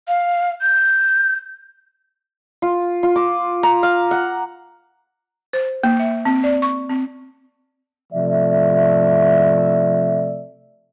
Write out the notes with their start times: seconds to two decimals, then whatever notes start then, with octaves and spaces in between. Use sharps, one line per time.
0.08 F5
0.62 G6
2.62 F4
3.03 F4
3.16 D6
3.63 A#5
3.83 F5
4.11 F#5
5.53 C5
5.83 A#3
5.99 E5
6.25 C4
6.44 D5
6.62 C#6
6.89 C4
8.13 C3 F3 A3 D5 E5